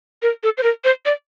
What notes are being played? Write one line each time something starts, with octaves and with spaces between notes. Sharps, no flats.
A#4
A4
C5
A#4
C5
D5